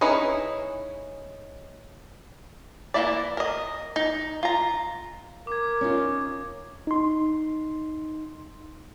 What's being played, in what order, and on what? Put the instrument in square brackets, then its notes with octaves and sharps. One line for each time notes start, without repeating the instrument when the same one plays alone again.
[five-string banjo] C#4 D#4 E4 G#4 B4
E3 F#3 A#3 E4 D5
A#4 D#5
D#4
F4 A#5
[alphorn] A#4 [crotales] D6 G#6
[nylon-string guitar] C#4 D#4 F4
[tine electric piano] D#4 C6